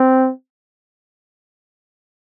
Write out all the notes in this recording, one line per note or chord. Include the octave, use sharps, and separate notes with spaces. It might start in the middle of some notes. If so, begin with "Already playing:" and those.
Already playing: C4